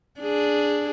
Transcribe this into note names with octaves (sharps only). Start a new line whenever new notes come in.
D4 G#4